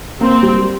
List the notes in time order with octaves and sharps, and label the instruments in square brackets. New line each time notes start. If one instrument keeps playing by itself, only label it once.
[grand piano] A#3 [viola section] C4
[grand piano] G3